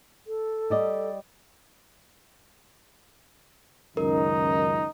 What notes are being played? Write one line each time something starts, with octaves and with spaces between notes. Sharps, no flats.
A4
G3 D5 D#5
C#2 F#2 D#3 D#4 A#4